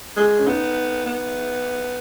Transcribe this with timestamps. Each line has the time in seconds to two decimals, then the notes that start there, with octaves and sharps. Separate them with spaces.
0.17 G#3
0.39 C#4
0.46 B3 D#4
1.06 B3